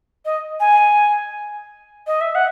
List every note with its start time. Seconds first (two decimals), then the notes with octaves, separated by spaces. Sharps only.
0.25 D#5
0.60 G#5
2.06 D#5
2.20 E5
2.34 F#5